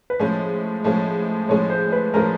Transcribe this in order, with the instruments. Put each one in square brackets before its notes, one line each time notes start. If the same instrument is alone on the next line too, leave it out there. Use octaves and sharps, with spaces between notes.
[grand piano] B4
[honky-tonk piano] A2 F3 G#3 C#4 [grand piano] C5
[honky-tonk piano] A2 F3 G#3 C#4
[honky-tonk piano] A2 F3 G#3 C#4 [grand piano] C#5
[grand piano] C5
B4
[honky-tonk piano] A2 F3 G#3 C#4 [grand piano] A#4